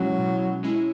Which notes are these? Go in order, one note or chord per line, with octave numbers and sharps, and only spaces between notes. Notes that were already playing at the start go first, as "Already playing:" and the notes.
Already playing: B2 F#3 G#3 C#4 E4
B2
G#3 C#4 E4